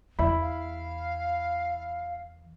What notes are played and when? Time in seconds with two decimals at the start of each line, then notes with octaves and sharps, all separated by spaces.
0.19 E2 E4 B5
0.40 F5